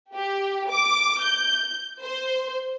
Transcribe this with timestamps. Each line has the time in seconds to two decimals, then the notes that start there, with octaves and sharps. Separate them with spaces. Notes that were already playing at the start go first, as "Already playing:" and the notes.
0.15 G4
0.71 D6
1.23 G6
2.03 C5